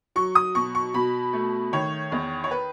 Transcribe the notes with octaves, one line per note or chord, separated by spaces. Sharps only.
F#3 C#6
D#6
B2 C#6
C#6
B2 B5
A3
D#3 C#5
E2
C#5
B4